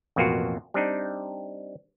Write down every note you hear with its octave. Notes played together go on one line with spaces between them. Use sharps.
A1 F2 B2 A#3 F4 F#4
G3 C4 D4 D#4